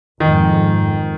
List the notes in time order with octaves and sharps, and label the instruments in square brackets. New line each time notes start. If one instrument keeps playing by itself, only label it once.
[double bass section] F2 G#2 [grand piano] D#3